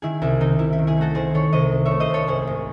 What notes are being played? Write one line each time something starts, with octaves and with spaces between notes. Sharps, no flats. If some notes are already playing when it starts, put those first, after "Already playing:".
D#3 E4 G#4
C2 E4
C3 D#4
C3 E4
E4
D#3
E4 G#4
A3 F#4 A4
D#3 G#4 C5
D#3 A4 C#5
C2 C5 D#5
C3
C#5 E5
A3
C5 D#5
C2 A4 C#5
G#1 G#4 C5
G#1